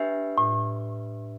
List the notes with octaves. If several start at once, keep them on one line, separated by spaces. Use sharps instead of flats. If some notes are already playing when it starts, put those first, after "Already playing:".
Already playing: D4 G4 B4 E5
A2